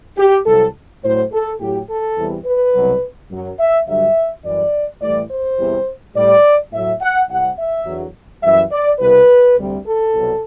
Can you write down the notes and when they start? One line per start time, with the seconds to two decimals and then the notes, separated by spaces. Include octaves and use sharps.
0.17 G4
0.46 C2 C3 F#3 A4
1.03 A2 F#3 C5
1.32 A4
1.60 A2 F#3 G4
1.89 A4
2.17 E2 C3 E3 G3
2.45 B4
2.74 C2 B2 F#3
3.31 F#2 F#3
3.59 E5
3.87 G2 D3 F#3 E5
4.44 F#2 E3 G3 D5
5.02 A2 E3 G3 D5
5.30 C5
5.59 E2 C3 E3 G3
6.15 A2 G3 D5
6.72 A2 F#3 E5
7.01 F#5
7.29 C2 C3 G3 F#5
7.58 E5
7.85 E2 D3 F#3
8.43 F#2 E3 G3 E5
8.71 D5
8.99 C2 B2 G3 B4
9.57 D2 C3 G3
9.85 A4
10.14 C2 B2 F#3